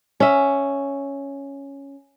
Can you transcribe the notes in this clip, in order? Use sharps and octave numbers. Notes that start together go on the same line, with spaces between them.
C#4 E5